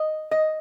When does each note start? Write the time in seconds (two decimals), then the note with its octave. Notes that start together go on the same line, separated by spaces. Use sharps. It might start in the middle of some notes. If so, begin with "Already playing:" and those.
Already playing: D#5
0.31 D#5